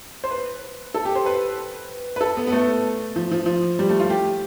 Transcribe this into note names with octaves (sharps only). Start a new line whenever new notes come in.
C5
B4
A4
G4
C5
B4
B4
A4
B3
B3
A3
F3
F3
F3
G3
A3
F4
G4